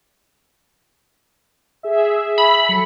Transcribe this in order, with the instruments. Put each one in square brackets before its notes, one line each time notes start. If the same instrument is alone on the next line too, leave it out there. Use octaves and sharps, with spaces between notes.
[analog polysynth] G#4 E5
[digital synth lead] B5
[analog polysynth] F#3 A4 C#7